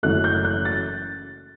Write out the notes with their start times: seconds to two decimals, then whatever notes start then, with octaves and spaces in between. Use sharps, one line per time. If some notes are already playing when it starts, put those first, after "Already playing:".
0.03 F#1 F#2 E3 A3 F#6
0.24 G6
0.44 F#6
0.65 A6